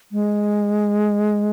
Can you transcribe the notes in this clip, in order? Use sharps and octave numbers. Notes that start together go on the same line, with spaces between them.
G#3